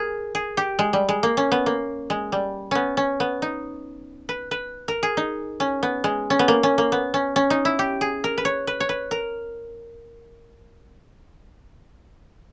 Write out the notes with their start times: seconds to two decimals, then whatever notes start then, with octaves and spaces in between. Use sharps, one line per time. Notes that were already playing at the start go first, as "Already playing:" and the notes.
Already playing: G#4 A#4
0.35 G#4
0.57 G4
0.79 G#3
0.93 G3
1.09 G#3
1.23 A#3
1.37 C#4
1.52 B3
1.66 A#3
2.10 G#3
2.32 G3
2.71 B3 C#4
2.97 C#4
3.20 B3
3.42 D#4
4.29 B4
4.51 B4
4.88 A#4
5.03 G#4
5.17 D#4
5.60 C#4
5.83 B3
6.04 G#3
6.30 C#4
6.39 B3
6.48 A#3
6.63 C#4
6.78 A#3
6.92 B3
7.14 C#4
7.36 C#4
7.50 D#4
7.65 E4
7.79 G4
8.01 G#4
8.24 A#4
8.38 B4
8.45 C#5
8.67 B4
8.80 C#5
8.89 B4
9.11 A#4